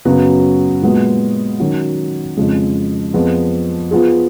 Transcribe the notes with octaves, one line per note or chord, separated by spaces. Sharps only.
F#2 C#3 F#3 B3 F#4
A#2 G#3 B3 F#4
D#3 F#3 C#4 F#4
F2 C#3 G#3
F2 F3 B3 F4 G#4
F3 B3 F4 G#4